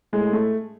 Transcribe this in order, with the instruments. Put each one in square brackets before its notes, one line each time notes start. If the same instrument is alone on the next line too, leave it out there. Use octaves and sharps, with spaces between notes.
[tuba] A2 [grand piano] G#3
[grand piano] A3